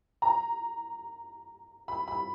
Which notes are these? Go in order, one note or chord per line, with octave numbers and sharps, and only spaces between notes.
A#5
B5
B5